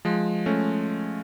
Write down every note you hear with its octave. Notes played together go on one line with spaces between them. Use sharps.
F3 G#3
A3 C#4